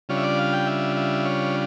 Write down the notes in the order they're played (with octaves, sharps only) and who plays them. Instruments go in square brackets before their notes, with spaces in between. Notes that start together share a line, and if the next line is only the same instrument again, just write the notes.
[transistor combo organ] C#3 G3 D4 F4 C#5
E5
D5
F5
G5
E5
E5
C#5